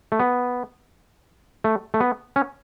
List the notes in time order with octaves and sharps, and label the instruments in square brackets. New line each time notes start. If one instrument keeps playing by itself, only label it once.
[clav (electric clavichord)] A3
B3
A3
A3
B3
C#4